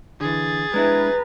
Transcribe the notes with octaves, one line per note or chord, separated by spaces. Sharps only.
D3 E3 G#4 A6
G#3 D4 E4 B4 A#5